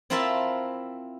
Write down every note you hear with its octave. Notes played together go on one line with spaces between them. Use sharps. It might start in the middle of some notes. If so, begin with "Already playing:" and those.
C4 E4 F4 A#4 E5 A5